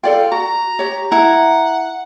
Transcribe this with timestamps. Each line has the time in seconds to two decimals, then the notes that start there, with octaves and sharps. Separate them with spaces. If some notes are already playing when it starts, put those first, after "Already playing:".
0.04 F4 A4 D5 G5
0.32 F#4 A#5
0.79 G4 C#5
1.12 E4 F#5 A#5